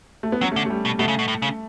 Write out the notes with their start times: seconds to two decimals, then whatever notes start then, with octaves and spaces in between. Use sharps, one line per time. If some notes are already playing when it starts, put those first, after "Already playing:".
0.23 A3
0.32 B3
0.41 F#3 C#4
0.52 A3
0.56 D3
0.66 A3
0.70 G3
0.85 B2
0.99 B2 A3
1.08 C#3
1.19 B2
1.28 A2
1.42 C#3